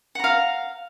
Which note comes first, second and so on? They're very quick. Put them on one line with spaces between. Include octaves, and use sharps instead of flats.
F#5 A#5 F5